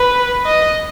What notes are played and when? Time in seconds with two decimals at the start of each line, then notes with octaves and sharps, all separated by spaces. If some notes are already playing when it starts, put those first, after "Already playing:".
Already playing: B4
0.45 D#5